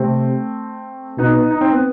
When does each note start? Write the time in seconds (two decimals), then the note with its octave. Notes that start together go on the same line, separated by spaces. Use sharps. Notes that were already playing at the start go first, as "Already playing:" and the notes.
Already playing: C3 A3 C4
1.18 B2 B3 D#4
1.51 D#4
1.61 C4
1.73 B3